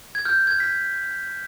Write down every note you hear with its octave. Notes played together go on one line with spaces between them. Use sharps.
G#6
F6 G6
G#6
F6 B6
G#6